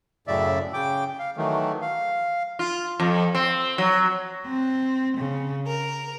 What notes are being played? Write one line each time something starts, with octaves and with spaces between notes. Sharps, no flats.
F#2 A2 C#3 D5 E5
C#3 G5 D6
F5
D#3 E3 F#3 A3
F5
F4
F2
C4
F#3
C4
C#3
A#4